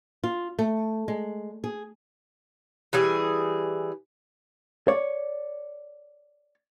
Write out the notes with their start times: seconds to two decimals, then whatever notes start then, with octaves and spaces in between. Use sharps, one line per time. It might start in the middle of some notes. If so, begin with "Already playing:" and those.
0.24 F4
0.59 A3
1.08 G#3
1.64 G#4
2.93 E3 G3 G#4
4.88 C#5 D5